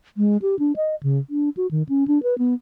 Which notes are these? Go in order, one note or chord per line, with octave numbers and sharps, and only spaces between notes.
G#3
G4
D4
D#5
C#3
D4
F#4
D#3
C#4
D4
B4
B3